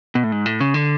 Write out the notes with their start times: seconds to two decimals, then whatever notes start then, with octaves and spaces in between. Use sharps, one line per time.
0.15 B2
0.24 A2
0.32 G#2
0.46 A2
0.60 C#3
0.74 D3